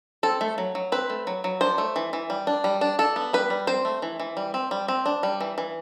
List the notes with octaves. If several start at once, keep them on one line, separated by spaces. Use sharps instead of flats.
C4 A4
A3
F#3
F#3
C4 B4
A3
F#3
F#3
D4 C5
A3
E3
E3
G3
D4
G3
D4
D4 A4
B3
G3 B4
G3
C4 C5
A3
E3
E3
G3
C4
G3
C4
D4
G3
E3
E3